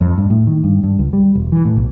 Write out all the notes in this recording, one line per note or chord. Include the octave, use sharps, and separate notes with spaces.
F2
G2
A2
D#3
G2
G2
C#2
G3
E1
E3
A2
B1